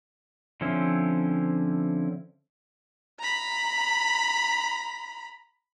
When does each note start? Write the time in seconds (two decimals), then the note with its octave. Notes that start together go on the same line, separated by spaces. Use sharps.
0.61 D3 F3 C4 C#4 E4
3.19 A#5 B5